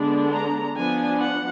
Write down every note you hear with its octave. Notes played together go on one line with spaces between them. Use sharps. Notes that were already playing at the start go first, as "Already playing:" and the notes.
Already playing: D3 G#3 B3 D4
A#5
F3 B3 D4 G#5
F#5